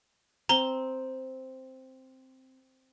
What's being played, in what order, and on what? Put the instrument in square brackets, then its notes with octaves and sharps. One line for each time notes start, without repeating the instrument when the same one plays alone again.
[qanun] C4 [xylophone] A#5 G7